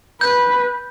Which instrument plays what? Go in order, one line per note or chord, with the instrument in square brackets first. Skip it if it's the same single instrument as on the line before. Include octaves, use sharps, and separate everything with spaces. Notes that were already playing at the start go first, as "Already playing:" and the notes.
[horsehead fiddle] B4 [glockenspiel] G6